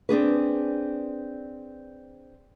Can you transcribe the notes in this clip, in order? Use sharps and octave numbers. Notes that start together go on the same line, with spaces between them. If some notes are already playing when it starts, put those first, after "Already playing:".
C4 D4 G#4 B4